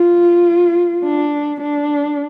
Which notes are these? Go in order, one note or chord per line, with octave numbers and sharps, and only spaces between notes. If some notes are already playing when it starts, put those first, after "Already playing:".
Already playing: F4
D4
D4